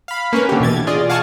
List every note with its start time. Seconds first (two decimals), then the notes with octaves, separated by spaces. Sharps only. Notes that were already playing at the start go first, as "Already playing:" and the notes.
0.08 F5 B5
0.33 A#3 C#4 B4
0.49 D3 G4
0.60 B2 E3 G#6 A6
0.87 F4 G#4 D5 D#5
1.09 F5 F#5 G#5 A5 C#6